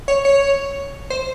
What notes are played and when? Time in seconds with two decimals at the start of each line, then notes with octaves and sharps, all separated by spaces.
0.08 C#5
0.25 C#5
1.10 C5